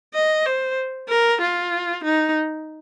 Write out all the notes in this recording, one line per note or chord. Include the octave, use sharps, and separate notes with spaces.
D#5
C5
A#4
F4
D#4